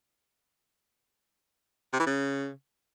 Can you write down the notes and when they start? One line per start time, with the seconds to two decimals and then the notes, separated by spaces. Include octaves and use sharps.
1.93 C3
2.00 E3
2.07 C#3